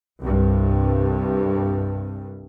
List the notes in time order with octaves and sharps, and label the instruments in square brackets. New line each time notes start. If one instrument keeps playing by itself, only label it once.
[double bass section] C2 G2